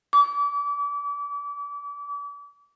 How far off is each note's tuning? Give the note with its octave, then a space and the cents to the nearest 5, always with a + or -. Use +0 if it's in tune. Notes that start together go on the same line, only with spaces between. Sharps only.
D6 -40